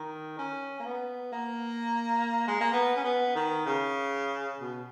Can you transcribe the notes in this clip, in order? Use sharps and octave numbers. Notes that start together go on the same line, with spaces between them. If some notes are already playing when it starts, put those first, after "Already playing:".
Already playing: D#3
C#4
A#3
B3
A#3
G#3
A#3
B3
C#4
B3
D#3
C#3
B2